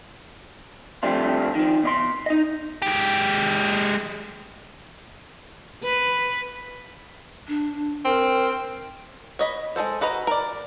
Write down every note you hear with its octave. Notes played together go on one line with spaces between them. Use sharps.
F3 G3 A3 C4 D4 F4
D#3 F3
B2 D5 C6
D#4 D#5
G#3 G4
B4
D4
C4 A#4
C#5 D#5 B5
G#3 C4 A4 C5
F#4 B4 D#5 A#5
A#4 D5